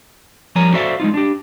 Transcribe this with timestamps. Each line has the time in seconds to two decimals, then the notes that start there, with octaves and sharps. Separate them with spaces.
0.56 F3 G3 A#4 C#5 G#5 A#5
0.74 F#4 A4 C5 D5 E5 F5
1.00 G#3 A#3 D#4 F4
1.14 D4 G4